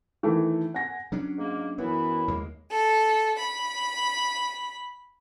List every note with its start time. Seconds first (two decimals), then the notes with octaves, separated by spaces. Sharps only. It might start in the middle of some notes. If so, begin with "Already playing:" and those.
0.23 D#3 E3 A3
0.74 F#5 G#5 A#6
1.12 F#3 C#4 D4
1.38 G#2 A#3
1.78 F#2 E3 B3 E4
2.28 D#2 G#3 A#3
2.71 A4
3.38 B5